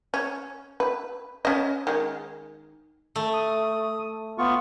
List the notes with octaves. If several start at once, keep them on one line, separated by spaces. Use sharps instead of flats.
C#4
B4
C#4 D#5
D#3 G#3
A3
D#6
B3 F4 C#6